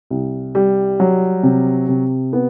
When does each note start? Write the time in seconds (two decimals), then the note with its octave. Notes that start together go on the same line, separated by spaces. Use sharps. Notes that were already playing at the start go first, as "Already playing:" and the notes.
0.10 C2
0.55 G3
1.00 F#3
1.43 C3
1.88 C3
2.33 B3